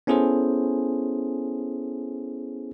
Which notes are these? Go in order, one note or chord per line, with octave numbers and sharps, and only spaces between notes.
B3 C#4 E4 G#4 A4 C5